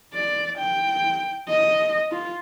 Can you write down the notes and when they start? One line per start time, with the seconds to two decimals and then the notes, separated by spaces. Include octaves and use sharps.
0.14 D5
0.58 G5
1.49 D#5
2.11 F4